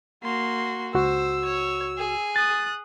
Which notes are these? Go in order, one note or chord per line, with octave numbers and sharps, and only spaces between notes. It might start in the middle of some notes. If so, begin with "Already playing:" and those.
A#3 F#4 C6
C#2 F#4 C5 E6
C#5
G#4
D#6 F#6 A6